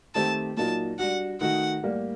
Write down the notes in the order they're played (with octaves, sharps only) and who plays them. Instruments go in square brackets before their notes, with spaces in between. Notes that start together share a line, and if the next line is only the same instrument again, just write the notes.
[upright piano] D#3 A3 C4 G4 [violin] A5
[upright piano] A#2 F#3 A#3 D#4 F#4 [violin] A5
[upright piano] G3 D4 F#4 [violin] F#5
[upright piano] D#3 A3 D#4 F#4 [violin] F#5
[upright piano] A2 G3 A#3